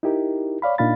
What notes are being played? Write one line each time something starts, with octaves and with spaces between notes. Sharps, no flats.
D#4 E4 G4 A#4
C#5 D5 F5 B5
A#2 D4 D#4 F5 B5 A6